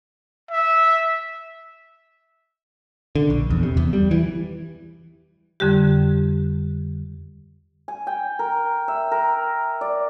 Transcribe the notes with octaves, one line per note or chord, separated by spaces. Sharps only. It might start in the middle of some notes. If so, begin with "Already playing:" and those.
E5
D3
A#1
E2
C3
E2
G3
E3
F2 D3 G3 G4
G#5
G5
A#4
E5
A#4
D5